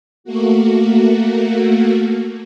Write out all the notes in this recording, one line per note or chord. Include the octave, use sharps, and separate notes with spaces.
A3 A#3 F#4